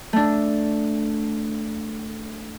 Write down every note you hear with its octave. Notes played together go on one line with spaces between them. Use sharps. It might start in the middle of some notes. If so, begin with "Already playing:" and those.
A3 D4